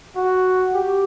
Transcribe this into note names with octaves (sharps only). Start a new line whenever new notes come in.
F#4
G4